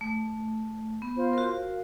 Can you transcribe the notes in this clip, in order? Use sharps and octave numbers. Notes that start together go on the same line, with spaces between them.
A3
B3
F4 C5
F#4 A#4
F5